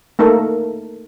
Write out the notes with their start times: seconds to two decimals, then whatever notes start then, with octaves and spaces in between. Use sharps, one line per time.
0.19 A3 A#3 D#4 A4 A#4